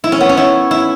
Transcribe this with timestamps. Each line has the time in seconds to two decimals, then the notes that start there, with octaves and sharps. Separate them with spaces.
0.04 E4
0.12 C#4
0.21 B3
0.29 C#4
0.37 E4
0.71 E4